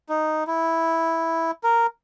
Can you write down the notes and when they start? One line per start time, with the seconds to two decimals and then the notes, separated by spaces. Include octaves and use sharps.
0.09 D#4
0.47 E4
1.63 A#4